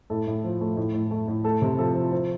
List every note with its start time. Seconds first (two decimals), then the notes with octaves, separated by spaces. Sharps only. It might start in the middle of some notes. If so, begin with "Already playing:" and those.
0.10 A2 A4
0.27 A2
0.44 F3
0.61 A3
0.77 A2
0.94 A2
1.11 A3
1.28 A2
1.44 A3 A4
1.62 C3
1.78 F3 A4
1.95 F3
2.11 F3 C5